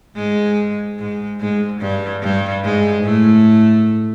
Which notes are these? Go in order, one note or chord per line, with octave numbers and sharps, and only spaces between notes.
G#2 G#3
G#2 G#3
G#2 G#3
G2 G3
G2 G3
G#2 G#3
A2 A3